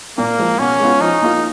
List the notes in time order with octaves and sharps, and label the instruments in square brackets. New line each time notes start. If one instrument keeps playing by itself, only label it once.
[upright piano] A#2 [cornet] A#3
[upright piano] F3 G#3
[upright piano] B2 [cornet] C#4
[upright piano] G#3 B3 F4
[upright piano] F3 [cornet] D#4
[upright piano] A#3 F4